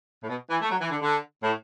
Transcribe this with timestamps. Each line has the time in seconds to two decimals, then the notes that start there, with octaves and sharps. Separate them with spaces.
0.23 A2
0.29 B2
0.50 E3
0.62 A3
0.71 F#3
0.81 E3
0.91 D3
1.01 D3
1.43 A2